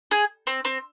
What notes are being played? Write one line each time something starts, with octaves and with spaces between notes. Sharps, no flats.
G#4
C4
C4